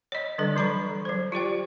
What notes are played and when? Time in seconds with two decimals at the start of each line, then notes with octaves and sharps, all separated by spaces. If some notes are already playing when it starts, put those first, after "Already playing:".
0.12 C#5 D#5
0.38 D3 G3 D4 A4
0.56 E3 F#3 A#5 B5 C#6
1.05 F#3 C5
1.32 F4 G4 D5 G5